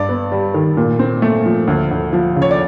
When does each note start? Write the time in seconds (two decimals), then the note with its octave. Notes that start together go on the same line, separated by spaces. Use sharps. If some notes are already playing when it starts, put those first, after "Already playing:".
Already playing: G2 D5
0.09 B3
0.32 G3
0.54 D#3
0.77 A#2
0.99 C4
1.22 A3
1.46 F3
1.67 D2
1.91 D2
2.13 F3
2.36 C#3
2.42 C#5
2.51 D5